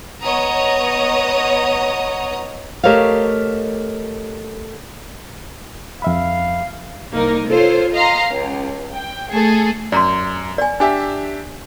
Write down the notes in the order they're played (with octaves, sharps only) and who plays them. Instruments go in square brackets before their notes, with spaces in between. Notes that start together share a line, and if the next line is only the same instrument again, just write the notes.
[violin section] B3 C#5 D#5 F#5 A#5 D#6
[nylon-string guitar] A3 G4 A#4 C#5 D#5 F5
[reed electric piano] F2 E5 B5 [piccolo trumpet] F5
[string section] C2 A#3 D#4 A#4
F4 A4 C5 C#5
D#5 F5 A#5 C6
C#2
G5
A3 G#4 A4
[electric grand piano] F#2 [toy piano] D5 A#5 C6
[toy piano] D5 G#5
[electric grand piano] D4 G4 E5 [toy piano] G#5